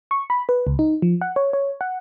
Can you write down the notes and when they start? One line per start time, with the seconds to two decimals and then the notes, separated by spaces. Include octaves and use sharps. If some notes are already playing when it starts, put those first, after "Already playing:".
0.11 C#6
0.30 B5
0.49 B4
0.67 C#2
0.79 D#4
1.02 F3
1.21 F#5
1.36 C#5
1.53 C#5
1.81 F#5